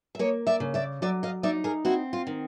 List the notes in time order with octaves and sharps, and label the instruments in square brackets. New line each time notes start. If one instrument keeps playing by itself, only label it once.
[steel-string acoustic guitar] E5
A#3 C#5 D#5
D5 E5
C#3
D5 E5
F#3 D5 E5
D#5 F5
D#4 D5 E5
G#4 A#4
C4 E4 F#4
F4
D#3